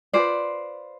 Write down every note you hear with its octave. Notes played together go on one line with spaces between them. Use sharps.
F4 G#4 B4 C5 D5